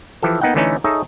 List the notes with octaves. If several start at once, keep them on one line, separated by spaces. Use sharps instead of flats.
E3 F3 G4 A4
A#3 B3 D#4 F#5 G5
D3 E3 A3 C#4 D#4
D#4 G#4 A4 C#5 D#5 E5